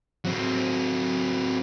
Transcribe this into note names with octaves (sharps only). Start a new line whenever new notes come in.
F#3 C4